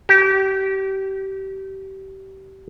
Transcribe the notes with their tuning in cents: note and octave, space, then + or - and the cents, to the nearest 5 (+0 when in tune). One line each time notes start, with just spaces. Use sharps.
G4 -30